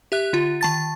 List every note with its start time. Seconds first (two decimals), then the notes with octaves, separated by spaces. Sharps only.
0.12 G4 E5 F#6
0.33 D3 F4
0.61 D#3 A5 A6